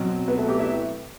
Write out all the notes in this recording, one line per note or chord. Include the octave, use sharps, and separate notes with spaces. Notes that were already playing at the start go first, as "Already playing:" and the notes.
Already playing: B2 F#3 C4
B3 B4
A3 A4
G4
E4 E5